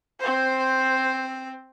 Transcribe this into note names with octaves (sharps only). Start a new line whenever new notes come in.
C4 C5